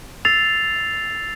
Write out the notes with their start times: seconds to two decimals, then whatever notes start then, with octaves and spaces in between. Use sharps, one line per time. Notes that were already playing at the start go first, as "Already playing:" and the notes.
0.25 E6 A6 C7 F7